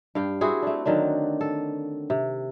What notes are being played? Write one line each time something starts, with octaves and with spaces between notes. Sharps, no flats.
G2 F5 G5
C4 E4 F#4 G#4
A3 D4
D3 D#3 F#3 D4
A4
C3